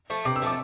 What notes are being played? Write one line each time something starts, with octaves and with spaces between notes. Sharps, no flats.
F3 A3
C3 D6
E6
F3 A3 D6